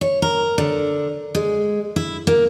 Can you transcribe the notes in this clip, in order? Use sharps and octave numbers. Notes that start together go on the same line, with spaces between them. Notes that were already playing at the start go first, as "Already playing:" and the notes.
C#5
A#4
D3
G#3
E4
A#3